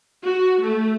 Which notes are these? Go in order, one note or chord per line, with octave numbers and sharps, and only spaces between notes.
F#4
A3